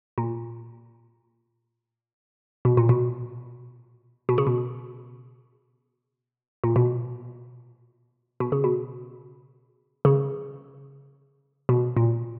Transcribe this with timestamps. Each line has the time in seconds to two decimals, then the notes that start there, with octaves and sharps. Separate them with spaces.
0.18 A#2
2.65 B2
2.77 A#2
2.89 B2
4.29 B2
4.38 C#3
4.47 B2
6.64 A#2
6.76 B2
8.40 B2
8.52 C#3
8.64 B2
10.05 C#3
11.69 B2
11.97 A#2